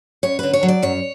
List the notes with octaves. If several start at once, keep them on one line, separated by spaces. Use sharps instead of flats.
F#2 C#5
D3 B4
C#5
F#3
D5
F#2 C#5